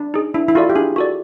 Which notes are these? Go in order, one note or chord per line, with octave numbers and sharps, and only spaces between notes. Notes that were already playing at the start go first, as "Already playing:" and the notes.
Already playing: D4
D#4 G#4
D4 E4
E4
F4 F#4 A4 D5
G4
D4 G#4
F#4 A4 D5